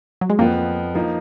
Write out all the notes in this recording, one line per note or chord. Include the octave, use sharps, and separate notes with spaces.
F#3
G#3
F2 F3 A#3 B3
F3 A#3 D#4